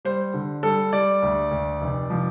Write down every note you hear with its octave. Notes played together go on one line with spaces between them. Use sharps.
G3 C5
D3
G3 A4
G3 D5
D2
D2
F1
F3